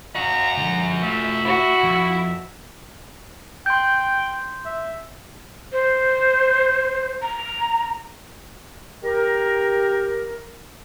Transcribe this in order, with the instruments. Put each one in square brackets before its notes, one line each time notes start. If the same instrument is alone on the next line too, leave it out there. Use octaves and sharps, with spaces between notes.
[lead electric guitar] C#4 F#4 [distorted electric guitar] D#5 F5 [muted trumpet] A#5
[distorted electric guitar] D3 F3
[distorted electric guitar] A3 F4 [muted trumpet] E5
[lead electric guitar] E4 [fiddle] F#4
[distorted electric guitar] F2
[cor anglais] G5 [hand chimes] C6 G6
[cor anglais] E5
[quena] C5
A#5
[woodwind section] G4 A#4